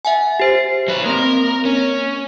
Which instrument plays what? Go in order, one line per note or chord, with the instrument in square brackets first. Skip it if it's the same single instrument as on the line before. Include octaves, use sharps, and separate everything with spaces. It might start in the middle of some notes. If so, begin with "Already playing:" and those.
[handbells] E5 F#5 G#5
G4 C5 C7
[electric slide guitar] F#3 B4
[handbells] A#3 C4 [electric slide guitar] A#4
[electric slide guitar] C#4